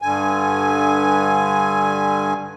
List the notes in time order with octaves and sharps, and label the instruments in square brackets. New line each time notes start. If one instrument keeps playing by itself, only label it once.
[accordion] G2 D3 G#5